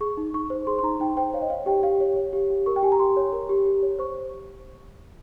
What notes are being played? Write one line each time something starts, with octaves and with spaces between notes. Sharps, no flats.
G#4 C#6
D#4
D#4 C#6
C5
G#4 C6
C6
D#4 A#5
D#4 G5
C5 G5
C#5 F5
D#5
C#5 F5
G4 G5
G4 F5
C#5
C#5
G4
G4
A#4 C#6
G5
G4 G#5
A#5
G4 C6
C#5
A#4
G4
G4
C#5
C5 C#6